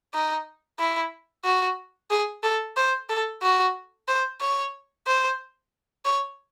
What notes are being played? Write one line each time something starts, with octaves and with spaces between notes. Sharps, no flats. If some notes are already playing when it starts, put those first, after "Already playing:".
D#4
E4
F#4
G#4
A4
C5
A4
F#4
C5
C#5
C5
C#5